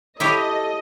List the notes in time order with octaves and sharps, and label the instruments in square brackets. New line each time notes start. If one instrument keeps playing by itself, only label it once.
[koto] E4 G4 C#5 [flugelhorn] A4 [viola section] D#5